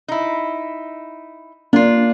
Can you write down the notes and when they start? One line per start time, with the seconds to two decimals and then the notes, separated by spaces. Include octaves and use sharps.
0.08 D#4 E4
1.73 A#3 D4 F4